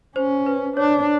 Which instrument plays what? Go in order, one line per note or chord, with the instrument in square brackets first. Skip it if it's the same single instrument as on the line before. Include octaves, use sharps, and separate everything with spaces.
[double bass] C#4 [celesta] C5
[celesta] B4
[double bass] D4 [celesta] C#5